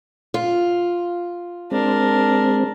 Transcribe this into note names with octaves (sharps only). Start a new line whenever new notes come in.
F4
G#3 C4 D4 A#4